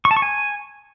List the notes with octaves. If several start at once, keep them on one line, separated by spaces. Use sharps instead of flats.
C#6
A5
C#6
G#5